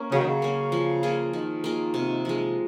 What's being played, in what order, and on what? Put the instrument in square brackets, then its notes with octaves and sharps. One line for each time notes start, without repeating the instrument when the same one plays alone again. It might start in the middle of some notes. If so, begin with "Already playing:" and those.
Already playing: [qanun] A#3 C#4
[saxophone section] C#3 [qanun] F#3
[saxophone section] D#3
C#3
[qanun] A#3 C#4
F3
A#3 F4 G#4
[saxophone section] D#3 [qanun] F3
[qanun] A#3 F4 G#4
C3
F3 G#3